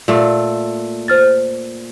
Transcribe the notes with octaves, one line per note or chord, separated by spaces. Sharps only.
A#2 A3
C5 F6 A6